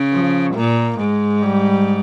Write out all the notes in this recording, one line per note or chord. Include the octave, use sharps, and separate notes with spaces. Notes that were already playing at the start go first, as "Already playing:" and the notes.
Already playing: C#3
F3
A#2 A#3
G#2 G#3
G3